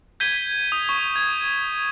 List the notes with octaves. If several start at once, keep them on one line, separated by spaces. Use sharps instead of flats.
G6 G#6 B6 D#7 G7
D#6
C#6
G#6